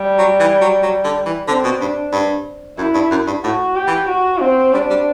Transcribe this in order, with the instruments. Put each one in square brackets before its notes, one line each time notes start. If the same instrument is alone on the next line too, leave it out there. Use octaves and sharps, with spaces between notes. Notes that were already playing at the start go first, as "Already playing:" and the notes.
Already playing: [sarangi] G3
[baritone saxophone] F#3
E3
F#3
F#3
D3
E3
[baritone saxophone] D3 [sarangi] C4
[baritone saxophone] B2
[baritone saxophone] G2 [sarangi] D4
[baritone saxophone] G2
[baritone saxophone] F#2 [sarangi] E4
[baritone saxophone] G2
F#2
G2
[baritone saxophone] A2 [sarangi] F#4
[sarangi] G4
[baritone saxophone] E3
[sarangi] F#4
C4
[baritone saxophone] G3 [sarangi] D4
[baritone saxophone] G3